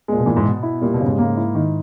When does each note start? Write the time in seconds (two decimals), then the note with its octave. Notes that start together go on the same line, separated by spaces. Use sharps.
0.08 A#2 G#3
0.18 B2
0.26 A#2 E3
0.36 G#2
0.45 B2 B3
0.63 E4
0.81 A#2 G3
0.94 B2
1.01 C#3
1.06 G#2
1.18 G#2 A#3
1.37 E4
1.55 D#3